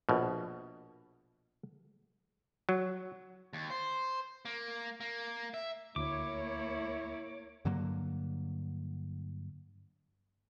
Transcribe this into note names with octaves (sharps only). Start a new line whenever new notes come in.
A#1 B2
F#3
D#2
C5
A#3
A#3
E5
D2 A#3 E4 C#5 D6
G2 D3 F#3 A#3